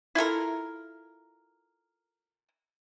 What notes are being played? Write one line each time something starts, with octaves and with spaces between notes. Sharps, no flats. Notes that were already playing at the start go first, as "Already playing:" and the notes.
E4 F4 A4 A#4